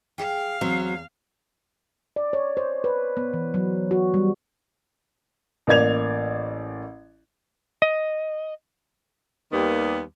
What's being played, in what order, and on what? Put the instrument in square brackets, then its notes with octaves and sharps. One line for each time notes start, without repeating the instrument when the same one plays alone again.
[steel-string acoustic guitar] G#4 G5 [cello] F5
[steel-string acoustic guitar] E2 [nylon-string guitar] F#3 C4
[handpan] D5
C#5
C5
B4
B3
E3
F#3
F#4
G3
[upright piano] A1 A#3 D5 G#6 F7
[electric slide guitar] D#5
[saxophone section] D#2 D#3 G3 A#3 B3